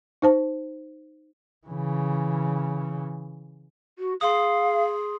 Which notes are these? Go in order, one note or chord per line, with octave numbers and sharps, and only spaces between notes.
D#4 C5 A5
C#3 E3
F#4
G#4 F5 C6 D#6